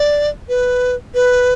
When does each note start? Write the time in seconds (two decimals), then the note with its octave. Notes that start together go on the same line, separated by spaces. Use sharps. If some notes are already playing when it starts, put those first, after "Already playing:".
Already playing: D5
0.49 B4
1.14 B4